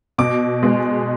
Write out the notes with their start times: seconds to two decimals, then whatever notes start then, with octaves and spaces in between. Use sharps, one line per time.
0.18 B2 D6
0.63 G#3 B3